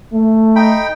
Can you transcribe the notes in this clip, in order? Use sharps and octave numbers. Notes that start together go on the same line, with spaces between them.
A3
D#4 G5 B5